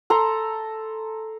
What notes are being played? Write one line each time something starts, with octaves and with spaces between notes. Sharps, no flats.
A4 A#5 C6